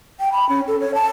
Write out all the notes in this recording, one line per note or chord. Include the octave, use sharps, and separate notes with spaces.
G5
B5
C#4
A4
C#5
A5